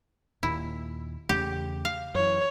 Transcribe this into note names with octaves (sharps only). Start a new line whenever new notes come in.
D#2 A#2 E4
E2 C#3 A3 G4
F5
F#2 E3 C#5